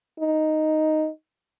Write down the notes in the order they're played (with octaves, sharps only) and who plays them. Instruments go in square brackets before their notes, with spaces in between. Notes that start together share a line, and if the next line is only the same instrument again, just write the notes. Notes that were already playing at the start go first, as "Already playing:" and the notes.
[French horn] D#4